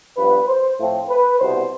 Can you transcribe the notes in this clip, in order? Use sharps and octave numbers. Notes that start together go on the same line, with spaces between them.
G2 F3 B3 B4
C5
A2 F3 A3 C4
B4
C2 B2 B3 C5